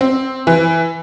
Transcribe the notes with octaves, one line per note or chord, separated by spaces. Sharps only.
C4
E3